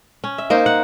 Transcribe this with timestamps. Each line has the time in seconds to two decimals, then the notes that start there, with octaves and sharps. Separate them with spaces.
0.24 C#4
0.38 E5
0.50 A#3 D#4 C5
0.66 F#5